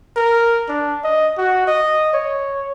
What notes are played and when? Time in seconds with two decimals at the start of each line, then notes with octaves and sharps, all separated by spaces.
0.16 A#4
0.69 D4
1.04 D#5
1.38 F#4
1.67 D#5
2.14 C#5